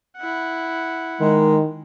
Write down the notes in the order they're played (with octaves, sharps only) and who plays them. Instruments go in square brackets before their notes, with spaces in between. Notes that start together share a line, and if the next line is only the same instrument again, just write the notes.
[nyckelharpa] E4 F#5
[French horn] D#3 [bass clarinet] G#3 [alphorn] A#4